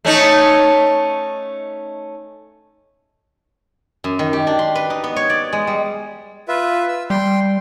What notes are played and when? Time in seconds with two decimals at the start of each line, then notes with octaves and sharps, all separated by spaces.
0.05 A3 C#4 D#4
4.04 F#2
4.19 D#3
4.33 G4
4.47 D4
4.59 C6
4.75 B4
4.90 D#4
5.04 B3
5.16 C#5
5.29 D5
5.53 G#3
5.67 G3
6.48 F4 B4 E5
6.88 E6
7.10 G3 G5 C6